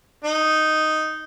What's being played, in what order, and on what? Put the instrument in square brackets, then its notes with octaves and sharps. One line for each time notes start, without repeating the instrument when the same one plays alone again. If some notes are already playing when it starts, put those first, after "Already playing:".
[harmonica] D#4